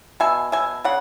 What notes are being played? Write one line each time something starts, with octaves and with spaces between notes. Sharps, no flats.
B2 E5 G#5
B2 E5 G#5
C#3 F#5